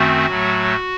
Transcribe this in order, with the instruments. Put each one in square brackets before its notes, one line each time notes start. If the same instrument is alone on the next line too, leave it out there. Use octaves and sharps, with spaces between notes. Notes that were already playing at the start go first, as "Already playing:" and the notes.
Already playing: [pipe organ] F#2 D#3 A3 C4 F#4
A2 F#3 A3